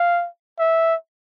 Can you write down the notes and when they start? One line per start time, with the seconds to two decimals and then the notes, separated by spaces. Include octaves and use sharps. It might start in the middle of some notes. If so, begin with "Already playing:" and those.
Already playing: F5
0.59 E5